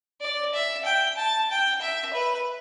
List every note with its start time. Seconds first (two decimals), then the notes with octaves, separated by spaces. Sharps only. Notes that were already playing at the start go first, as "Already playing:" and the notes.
0.21 D5
0.54 E5
0.85 G5
1.17 A5
1.50 G5
1.81 E5
2.14 B4